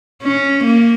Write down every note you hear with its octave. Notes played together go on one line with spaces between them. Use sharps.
C#4
A#3